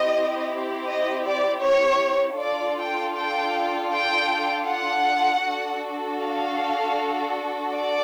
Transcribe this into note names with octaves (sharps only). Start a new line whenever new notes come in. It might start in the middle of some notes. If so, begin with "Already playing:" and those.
Already playing: C4 E4 G4 D#5
D#5
D5
C#5
D4 F4 A4 D5
G5
G5
G5
F#5
D4 F#4 A4
F5
D5